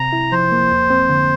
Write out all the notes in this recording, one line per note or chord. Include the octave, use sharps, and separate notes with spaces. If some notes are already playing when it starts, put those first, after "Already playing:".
Already playing: C3 A#5
E4
F3 C5
A#3
F2
C4
D3